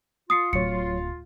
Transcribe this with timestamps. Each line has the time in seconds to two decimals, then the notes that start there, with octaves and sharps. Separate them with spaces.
0.30 F4 D#6 C7 C#7
0.53 D1 F#3 C#5 C#7